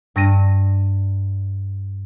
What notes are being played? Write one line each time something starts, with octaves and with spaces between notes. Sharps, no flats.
G2 A#6 D#7